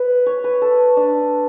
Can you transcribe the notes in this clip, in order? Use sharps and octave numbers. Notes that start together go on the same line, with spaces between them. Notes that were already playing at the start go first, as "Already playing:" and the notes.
Already playing: B4
C#5
B4
A4
D4